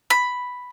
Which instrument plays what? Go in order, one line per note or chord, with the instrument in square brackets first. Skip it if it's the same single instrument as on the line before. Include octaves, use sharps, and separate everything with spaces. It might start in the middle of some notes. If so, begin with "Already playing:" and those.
[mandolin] B5